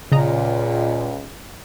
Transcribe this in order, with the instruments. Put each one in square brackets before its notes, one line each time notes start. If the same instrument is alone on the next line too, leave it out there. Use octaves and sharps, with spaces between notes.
[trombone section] C#2 [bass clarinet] A#2 [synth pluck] C#3 D#5 A#5